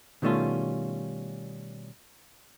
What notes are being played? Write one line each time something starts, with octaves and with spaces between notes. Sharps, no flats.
B2 D#3 G3 A3 C#4 F4